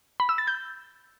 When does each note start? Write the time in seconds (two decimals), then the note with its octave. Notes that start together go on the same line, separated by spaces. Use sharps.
0.20 B5
0.29 E6
0.38 A6
0.47 G6